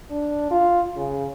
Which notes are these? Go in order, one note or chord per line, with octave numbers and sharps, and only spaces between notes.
D4
F4
C#3